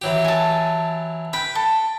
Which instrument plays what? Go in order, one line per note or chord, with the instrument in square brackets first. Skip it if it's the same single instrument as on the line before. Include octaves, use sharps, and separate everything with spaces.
[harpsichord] E3 F#3 G4
[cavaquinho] G#5 A5
[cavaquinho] B4 B5 [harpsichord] G5
[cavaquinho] A4